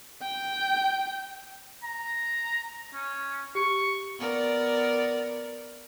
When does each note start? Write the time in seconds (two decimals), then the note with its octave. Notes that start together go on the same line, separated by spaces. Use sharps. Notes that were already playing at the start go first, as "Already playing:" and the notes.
0.22 G5
1.83 A#5
2.93 C#4
3.55 G4 C#6
4.19 B3 A#4 D5